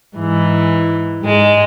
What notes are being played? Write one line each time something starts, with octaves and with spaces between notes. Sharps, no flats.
G#2 E3
G#2 G#3